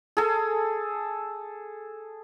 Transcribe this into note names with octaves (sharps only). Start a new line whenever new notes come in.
G#4 A4